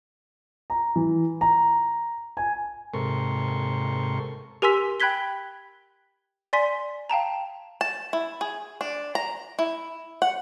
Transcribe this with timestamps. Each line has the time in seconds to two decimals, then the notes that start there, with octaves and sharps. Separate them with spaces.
0.70 A#5
0.96 E3
1.41 A#5
2.37 G#5
2.94 G#2 C3 A4 A#4 C6 C#6
4.62 G4 A#4 G#5 C6 E6 B6
5.00 G5 B5 F#6 G#6 B6 G7
6.53 D5 G#5 C6 B6
7.10 F5 G5 A5 A#5
7.81 A5
8.13 E4
8.41 G#4
8.81 D4
9.15 A#5
9.59 E4
10.22 F#5